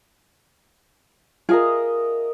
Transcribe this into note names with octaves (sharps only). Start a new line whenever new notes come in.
F4 G#4 A#4 D#5 E5